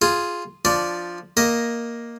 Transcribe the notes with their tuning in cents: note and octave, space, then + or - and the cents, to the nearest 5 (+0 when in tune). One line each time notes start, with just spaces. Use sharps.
F4 +0 G#4 +0
F3 +0 D4 +0 D5 +0
A#3 +5 D#5 +0